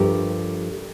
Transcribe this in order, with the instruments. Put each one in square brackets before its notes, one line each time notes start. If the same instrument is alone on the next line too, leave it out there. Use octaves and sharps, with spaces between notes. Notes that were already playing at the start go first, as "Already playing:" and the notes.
Already playing: [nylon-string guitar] G2 F3 A3 G4 A#4